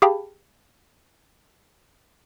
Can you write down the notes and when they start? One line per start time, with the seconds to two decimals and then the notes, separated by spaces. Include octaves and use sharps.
0.02 G4 G#4 F5 G5 A5 B5